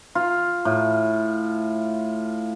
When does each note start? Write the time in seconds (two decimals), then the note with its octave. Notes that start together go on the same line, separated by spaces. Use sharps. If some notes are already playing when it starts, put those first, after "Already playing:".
0.15 F4
0.65 A2